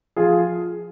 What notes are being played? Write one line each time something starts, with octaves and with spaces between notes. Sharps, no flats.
F3 F4 G#4